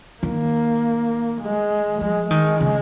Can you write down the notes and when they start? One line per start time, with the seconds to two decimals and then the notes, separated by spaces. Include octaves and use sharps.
0.23 D#3 A#3
1.41 G#3
2.01 F3 G#3
2.31 D#3 G#3
2.61 C#3